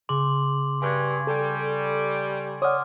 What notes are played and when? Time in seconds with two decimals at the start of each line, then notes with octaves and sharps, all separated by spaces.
0.09 C#3 C6 D6 F#7
0.82 G2 G#5 C#6 G#6
1.27 G3 A4
2.62 C#5 D5 F#5 C6 D6 D#6 F6